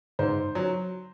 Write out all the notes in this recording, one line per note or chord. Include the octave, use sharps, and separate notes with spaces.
G#2 C5
F#3